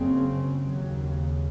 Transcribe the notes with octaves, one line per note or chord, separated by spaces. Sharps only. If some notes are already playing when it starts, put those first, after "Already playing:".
Already playing: F#1 F#2 C#3 C4
D#2 C#3 F#3